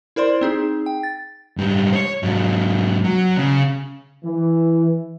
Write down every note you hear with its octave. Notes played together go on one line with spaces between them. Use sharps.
E4 A#4 C5 D5 C6
C4 D#4 G#4
G5
A6
G#2 G3
C5 C#5
G#2 F#3
F#3
C#3
E3